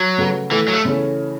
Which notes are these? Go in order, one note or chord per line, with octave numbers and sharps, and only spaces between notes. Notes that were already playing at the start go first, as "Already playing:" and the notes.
Already playing: F#3
C#3 A3 F#4 B4
A2 E3 A3 E4
F#3
A3
C#3 E3 A3 C#4